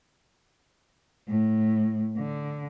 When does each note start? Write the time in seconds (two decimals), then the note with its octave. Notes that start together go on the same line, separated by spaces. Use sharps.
1.27 A2
2.16 D3